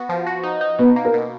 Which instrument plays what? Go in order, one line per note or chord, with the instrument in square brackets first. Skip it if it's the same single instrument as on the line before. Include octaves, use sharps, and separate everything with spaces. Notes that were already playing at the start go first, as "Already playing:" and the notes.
Already playing: [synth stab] B3 F#4
F3
F#4
D#4
D#4
[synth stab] B2 [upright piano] B3
[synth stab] A#3
[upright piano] A#4
[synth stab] B2